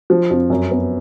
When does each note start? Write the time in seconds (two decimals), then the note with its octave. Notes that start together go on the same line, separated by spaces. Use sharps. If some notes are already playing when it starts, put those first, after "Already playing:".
0.10 F3
0.31 F2
0.50 F#2
0.71 B3